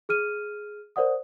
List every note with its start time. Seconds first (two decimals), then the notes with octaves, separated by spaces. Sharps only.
0.09 G#4 F6 D#7
0.96 A#4 C5 D5 F#5 D#6